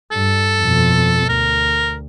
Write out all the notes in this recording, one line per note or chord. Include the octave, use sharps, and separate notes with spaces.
G2 A4
F2 B2
D2 A#4